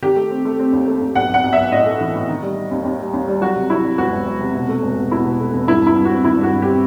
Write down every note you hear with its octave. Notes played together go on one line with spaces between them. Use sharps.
D#3 G4
A3
C4
A3
C4
D#2
A3
D#2
B1 F#5
B1 F#5
B1
E5
B1
A2 D#5
A3
E3
A2
D#3
G3
G3
D#2
D#2
G3
D#2
G3
F#3 F#4
C3
F#3 E4
F#3
E1 F#4
E1
F#3
C3
B2
A3
E1
B2
B2 E4
B2
A3
E2
G2 E4
G2 E4
G2
F#4
C4
D#3 E4
G2 F#4
G2
C4 G4